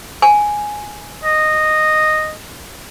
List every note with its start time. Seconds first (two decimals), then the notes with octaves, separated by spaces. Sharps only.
0.22 G#5
1.24 D#5